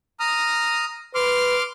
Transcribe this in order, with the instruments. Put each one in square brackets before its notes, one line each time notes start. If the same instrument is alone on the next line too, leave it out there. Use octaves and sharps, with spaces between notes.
[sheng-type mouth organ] A#5 D#6 F6
[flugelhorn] B4 [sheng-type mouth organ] C6 D6 F6